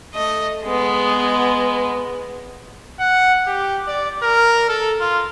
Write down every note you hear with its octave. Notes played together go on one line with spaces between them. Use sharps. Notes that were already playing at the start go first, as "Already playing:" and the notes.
A3 D#5
G#3 B3
F#5
G4
D5
A#4
A4
F4